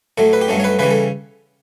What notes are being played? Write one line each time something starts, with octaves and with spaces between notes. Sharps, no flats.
A2 F#3 A3 A4
B4
G4
G2 F#3 A3 C#4 A4
C#5
B4
C#3 E3 G3 C#4 B4
A4